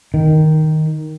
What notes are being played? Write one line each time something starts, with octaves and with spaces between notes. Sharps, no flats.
D#3